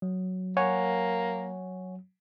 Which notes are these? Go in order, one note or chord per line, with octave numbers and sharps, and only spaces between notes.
F#3
A#3 C#5 F#5 G#5